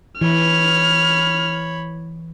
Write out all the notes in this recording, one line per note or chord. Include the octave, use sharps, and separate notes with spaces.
E3 C#5 B5 F6